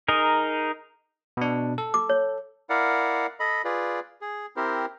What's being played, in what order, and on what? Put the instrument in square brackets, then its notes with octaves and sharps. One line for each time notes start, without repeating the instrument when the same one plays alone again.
[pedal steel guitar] D#4 G#4 A#4
[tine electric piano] B2 D4
A4
[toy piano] D6
C#5
[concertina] E4 A#4 D5 F5 F#5
A4 D#5 B5
F4 G#4 B4 D5
G#4
C4 E4 G4 A#4 C5